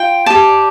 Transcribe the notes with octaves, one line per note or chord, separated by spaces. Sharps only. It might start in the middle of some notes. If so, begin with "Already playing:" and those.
Already playing: F4 G5
G4 D5 A5